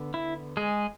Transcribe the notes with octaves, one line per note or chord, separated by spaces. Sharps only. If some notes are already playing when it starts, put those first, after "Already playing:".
Already playing: D3 B3
E4
G#3 G#4